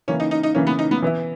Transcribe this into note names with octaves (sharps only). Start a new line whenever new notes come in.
C#3 E3 A#3 C#4
D#4
D#4
D#4
C#3 E3 A#3 C#4
B3
D#4
B3
E3 B3 E4